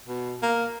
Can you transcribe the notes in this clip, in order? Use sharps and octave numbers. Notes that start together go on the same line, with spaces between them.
B2
A#3